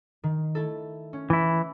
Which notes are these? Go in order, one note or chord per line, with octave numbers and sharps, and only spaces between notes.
D#3
A3 E4 A4
C#4
E3 E4